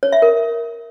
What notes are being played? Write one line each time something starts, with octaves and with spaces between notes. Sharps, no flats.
C#5
E5
A#4